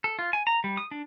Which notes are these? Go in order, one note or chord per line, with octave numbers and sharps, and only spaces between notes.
A4
F4
G#5
A#5
G3
D#6
D4